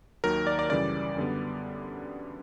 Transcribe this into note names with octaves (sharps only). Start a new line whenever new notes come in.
D#2 D#3 F#3 A#4
D5
D5
F#2 C#3 E3 G3 D5
F#2 D3 G3 B3